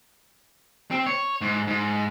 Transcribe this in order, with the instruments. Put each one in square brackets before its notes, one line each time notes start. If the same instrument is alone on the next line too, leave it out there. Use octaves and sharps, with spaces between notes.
[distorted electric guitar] C4
C#5
G#2
G#2